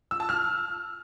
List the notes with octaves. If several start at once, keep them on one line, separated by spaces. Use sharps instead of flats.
E6
A5
F6